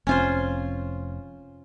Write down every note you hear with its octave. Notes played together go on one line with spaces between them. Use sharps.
F1 C4 C#4 F4 C5